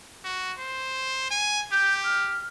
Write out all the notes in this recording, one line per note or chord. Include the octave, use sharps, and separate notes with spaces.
F#4
C5
G#5
G4 G6
F6